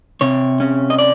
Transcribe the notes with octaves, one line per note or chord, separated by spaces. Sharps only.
C3 C#5
C#4
D#5
D5